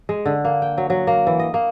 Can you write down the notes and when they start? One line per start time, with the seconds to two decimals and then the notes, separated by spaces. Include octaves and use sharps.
0.09 G#3
0.26 D3
0.45 A#3
0.62 G5
0.78 F#3
0.90 F#3
1.07 A#3
1.27 E3
1.39 D#5
1.54 A#3